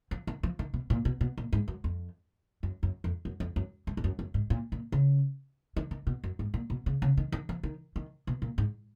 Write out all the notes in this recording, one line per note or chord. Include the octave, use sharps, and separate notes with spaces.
F3
D#3
F3
D#3
B2
A#2
B2
B2
A#2
G#2
F#2
F2
F#2
F#2
F2
F#2
F2
F#2
G#2
G#2
F#2
F#2
G#2
A#2
A#2
C#3
D#3
D#3
B2
F#2
G#2
A#2
B2
C#3
C#3
D#3
D#3
F3
D#3
D#3
B2
A#2
G#2